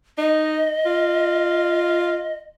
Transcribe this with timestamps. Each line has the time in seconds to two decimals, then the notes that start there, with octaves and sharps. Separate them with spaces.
0.18 D#4 D#5
0.86 F4